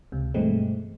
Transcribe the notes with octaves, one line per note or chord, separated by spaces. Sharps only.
C#2 C3
G2 B2 E3 G#3 A3 C4